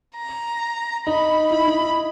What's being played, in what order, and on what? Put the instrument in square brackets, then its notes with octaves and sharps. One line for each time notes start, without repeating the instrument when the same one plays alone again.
[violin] A#5
[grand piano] D#4 [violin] B5
[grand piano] E4 [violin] B5
[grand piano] D#4
E4